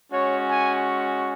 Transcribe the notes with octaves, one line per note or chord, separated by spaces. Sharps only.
G#3 C#4 F#4 C#5
G#5